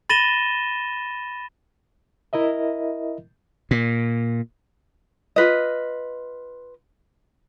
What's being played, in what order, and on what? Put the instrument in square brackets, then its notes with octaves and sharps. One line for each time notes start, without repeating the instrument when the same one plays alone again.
[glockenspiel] B5 A6 A#6 D#7 E7 G7
[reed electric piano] E4 A#4 D#5 E5
[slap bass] A#2
[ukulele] F4 B4 D#5